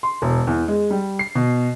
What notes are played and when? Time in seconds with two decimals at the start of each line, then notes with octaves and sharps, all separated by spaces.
0.03 C6
0.22 E1
0.47 E2
0.68 G#3
0.90 G3
1.19 C7
1.35 B2